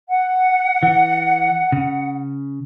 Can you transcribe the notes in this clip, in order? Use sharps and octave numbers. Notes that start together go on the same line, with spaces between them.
F#5
E3
C#3